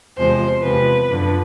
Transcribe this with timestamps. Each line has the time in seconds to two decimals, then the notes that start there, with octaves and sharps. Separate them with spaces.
0.18 E2 C3 F3 G#3 C5
0.63 E2 C3 F3 G#3 B4
1.09 F#2 D3 F3